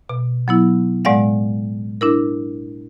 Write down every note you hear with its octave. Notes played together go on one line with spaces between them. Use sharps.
B2
F#3 B3 E4
A2 G#3 D5 F5 F#5
D4 E4 A#4